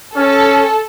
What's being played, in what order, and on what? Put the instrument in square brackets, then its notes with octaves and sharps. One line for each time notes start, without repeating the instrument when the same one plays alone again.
[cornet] C#4 [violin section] A4